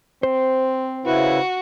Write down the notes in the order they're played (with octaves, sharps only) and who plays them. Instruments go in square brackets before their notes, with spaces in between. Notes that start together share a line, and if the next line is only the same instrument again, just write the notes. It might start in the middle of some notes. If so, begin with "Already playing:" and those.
[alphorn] C4 [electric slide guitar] C5
[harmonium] C#3 E4 B4 [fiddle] F#4